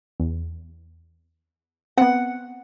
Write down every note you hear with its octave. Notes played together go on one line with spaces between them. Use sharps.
E2
B3 C4 F#5